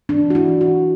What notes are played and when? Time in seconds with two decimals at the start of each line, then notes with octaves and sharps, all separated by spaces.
0.09 E3 D4
0.28 E3 F#4
0.35 E4
0.48 E3
0.61 F#4
0.68 E3